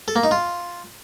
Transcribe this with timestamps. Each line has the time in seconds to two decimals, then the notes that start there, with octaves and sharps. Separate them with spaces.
0.08 A4
0.16 A#3
0.23 D#4
0.31 F4